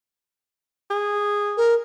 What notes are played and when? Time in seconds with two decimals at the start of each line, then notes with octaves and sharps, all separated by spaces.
0.90 G#4
1.57 A#4